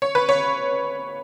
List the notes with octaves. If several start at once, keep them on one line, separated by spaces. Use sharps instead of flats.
C#5
B4
C#5